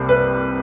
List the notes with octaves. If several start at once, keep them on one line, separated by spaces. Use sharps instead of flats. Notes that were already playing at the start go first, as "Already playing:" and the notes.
Already playing: C2 C3 G3 A#3
B4